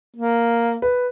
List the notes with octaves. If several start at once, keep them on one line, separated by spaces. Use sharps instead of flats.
A#3
B4